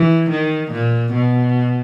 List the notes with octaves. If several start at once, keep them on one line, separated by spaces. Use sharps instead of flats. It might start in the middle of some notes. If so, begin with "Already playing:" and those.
Already playing: E3
D#3
A#2
B2